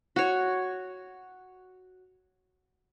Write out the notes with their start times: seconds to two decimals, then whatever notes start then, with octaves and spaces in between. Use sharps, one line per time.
0.16 F#4 C#5